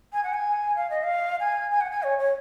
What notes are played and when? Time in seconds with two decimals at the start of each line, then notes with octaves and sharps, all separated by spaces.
0.13 G#5
0.24 F#5
0.34 G#5
0.76 F5
0.90 D#5
1.03 F5
1.40 G#5
1.71 G#5
1.81 F#5
1.91 G#5
2.03 C#5
2.19 C#5